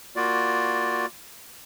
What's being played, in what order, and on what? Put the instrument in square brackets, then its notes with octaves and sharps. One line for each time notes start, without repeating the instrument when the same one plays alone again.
[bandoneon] A#3 F4 F#4 D5